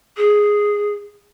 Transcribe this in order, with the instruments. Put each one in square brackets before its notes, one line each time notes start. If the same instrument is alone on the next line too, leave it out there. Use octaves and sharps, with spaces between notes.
[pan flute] G#4